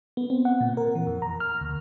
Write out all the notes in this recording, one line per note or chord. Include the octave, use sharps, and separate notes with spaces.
B3
C4
F#5
A#2
A#4
E3
F2
A#5
F6
D2